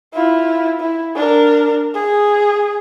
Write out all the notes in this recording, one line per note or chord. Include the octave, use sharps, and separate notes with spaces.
E4 F4
E4
D4 A#4
G#4